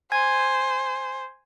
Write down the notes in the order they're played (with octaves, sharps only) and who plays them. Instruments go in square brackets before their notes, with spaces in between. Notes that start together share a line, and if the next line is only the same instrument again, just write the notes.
[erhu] C5 [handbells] G#5 G#6